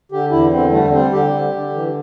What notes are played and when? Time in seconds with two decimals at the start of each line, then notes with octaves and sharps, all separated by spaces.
0.12 D3 G4
0.31 E2 E4
0.52 D3 C4
0.72 G3 A3
0.93 G3 C4
1.12 D3 G4
1.33 D3
1.53 D3
1.73 E3